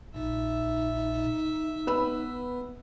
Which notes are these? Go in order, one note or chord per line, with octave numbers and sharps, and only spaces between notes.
A#1 A#2 D#4 E5
B3 B4 B5 E6